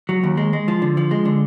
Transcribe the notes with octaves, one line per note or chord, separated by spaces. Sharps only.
F#3
D#2
G#3
G#3
F3
D3
F3
G#3
D3